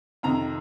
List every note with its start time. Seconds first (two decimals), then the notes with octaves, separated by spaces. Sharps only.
0.23 F2 C3 D#3 A#5